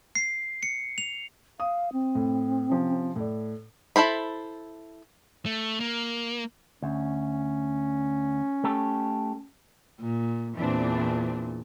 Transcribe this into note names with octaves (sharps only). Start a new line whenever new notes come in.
C7
C#7
F7
F5 D#6
C4
A2
C3 F3 C#4
A2 A4 D5
E4 A4 C5 B5
A3
A#3
D2 C#4
A3 G4 A4
A#2
E2 A#2 E3 C4 D4